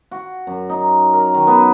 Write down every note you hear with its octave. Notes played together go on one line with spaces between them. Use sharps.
F#4
F#2
D#4
A#4
D#3
B3